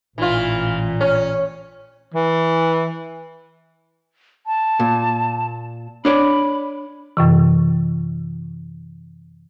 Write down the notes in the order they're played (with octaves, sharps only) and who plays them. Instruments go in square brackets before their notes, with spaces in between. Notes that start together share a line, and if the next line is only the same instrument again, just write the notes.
[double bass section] A1 [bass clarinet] A#2 [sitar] E3 F4
[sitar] C#4
[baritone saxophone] E3
[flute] A5
[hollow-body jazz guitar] A#2
[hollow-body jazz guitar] D4 C#5 D5 [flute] B5
[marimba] F#2 C3 E3